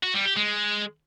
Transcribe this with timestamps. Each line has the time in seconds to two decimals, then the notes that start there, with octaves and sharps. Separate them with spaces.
0.03 F#4
0.14 G3
0.25 G4
0.37 G#3